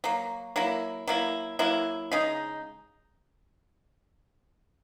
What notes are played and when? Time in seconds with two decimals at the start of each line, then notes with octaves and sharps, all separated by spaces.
0.04 F#3 A#3
0.56 F#3 A#3 E4
1.08 F#3 A#3 E4
1.59 F#3 A#3 E4
2.12 C#3 G#3 D#4